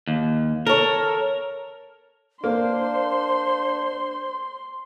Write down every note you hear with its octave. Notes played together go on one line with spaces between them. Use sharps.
D#2
A4 A#4 C#5
A#3 D4 C5 C6